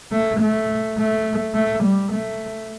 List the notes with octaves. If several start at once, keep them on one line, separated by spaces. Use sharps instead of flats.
A3
A3
A3
A3
G3
A3